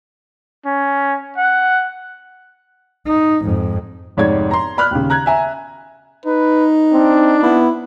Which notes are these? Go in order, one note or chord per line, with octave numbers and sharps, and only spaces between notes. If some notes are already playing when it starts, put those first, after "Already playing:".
C#4
F#5
D#4
F2 G#2
F1 G#2 C#5 D5 G#6
A#5 C6
D5 B5 F6 F#6
D#2 C#3
A#5 F#6 G#6
E5 G#5 A#5
D#4 B4
C4 D4
B3 E4